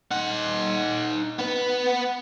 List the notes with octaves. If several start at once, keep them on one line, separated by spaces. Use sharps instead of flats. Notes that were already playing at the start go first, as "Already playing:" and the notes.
D#4 F#5
B3 B4